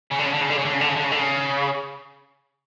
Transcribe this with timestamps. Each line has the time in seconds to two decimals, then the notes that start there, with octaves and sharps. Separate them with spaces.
0.12 C#3
0.20 D3
0.27 C#3
0.34 D3
0.42 C#3
0.50 D3
0.58 C#3
0.65 D3
0.74 C#3
0.81 D3
0.89 C#3
0.96 D3
1.04 C#3
1.11 D3
1.19 C#3